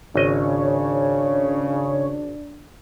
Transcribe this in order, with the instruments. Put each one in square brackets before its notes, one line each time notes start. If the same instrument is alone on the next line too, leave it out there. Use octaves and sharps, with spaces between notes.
[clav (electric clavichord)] G#1 D#5 [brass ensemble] C#3 [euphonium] D4 [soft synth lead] C#5